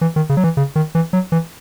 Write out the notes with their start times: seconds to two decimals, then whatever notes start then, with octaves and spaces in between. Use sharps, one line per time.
0.01 E3
0.16 D#3
0.29 C#3
0.37 F#3
0.44 E3
0.57 C#3
0.76 D#3
0.95 E3
1.13 F#3
1.32 E3